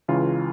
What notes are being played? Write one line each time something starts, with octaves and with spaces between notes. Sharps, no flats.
C#2 C#3 E3 F4